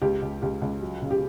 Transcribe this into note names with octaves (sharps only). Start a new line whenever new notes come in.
C#2 G4
C#2
C#2 G4
C#2
F#3
C#3
G4